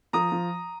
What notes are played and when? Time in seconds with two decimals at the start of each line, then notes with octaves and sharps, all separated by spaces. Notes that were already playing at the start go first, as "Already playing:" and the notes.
0.13 F3 A#5 D#6
0.32 F3